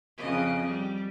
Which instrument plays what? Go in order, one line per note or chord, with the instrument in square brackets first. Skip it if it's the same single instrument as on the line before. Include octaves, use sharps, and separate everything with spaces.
[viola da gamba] F2 C#3 D#5
G3